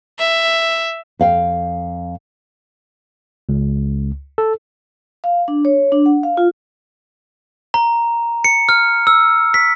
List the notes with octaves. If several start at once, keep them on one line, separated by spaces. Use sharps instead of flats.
E5
F2 F5 G5
C#2
A4
F5
D4
C#5
D4
F#5
F5
F4
A#5
C#7
F6
E6
B6